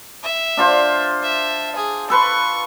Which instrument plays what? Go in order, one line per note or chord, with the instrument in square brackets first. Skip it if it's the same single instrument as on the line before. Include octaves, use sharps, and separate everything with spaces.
[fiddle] E5
[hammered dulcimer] D4 F4 C5
[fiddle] E5
G#4
[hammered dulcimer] A4 B4 C6 [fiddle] C#6